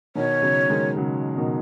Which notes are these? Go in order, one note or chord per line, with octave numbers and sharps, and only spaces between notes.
B2 D#3 C#5
C#3 F#3
D#3 G#3
C#3 F#3
B2 D#3